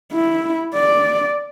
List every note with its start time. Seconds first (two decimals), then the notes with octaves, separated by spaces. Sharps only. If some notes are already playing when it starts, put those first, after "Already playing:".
0.13 E4
0.75 D5